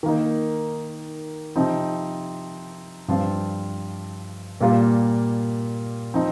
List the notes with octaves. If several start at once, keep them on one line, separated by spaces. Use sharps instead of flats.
D#3 A#3 D#4
C3 F3 C4 D#4
G2 F3 C4 F4
A#2 G3 A#3 F4
F3 C4 D#4